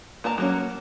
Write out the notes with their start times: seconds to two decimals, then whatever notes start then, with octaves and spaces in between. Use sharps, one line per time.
0.24 A#3 A#4 A5 A#5
0.38 F#3 A#3 C#4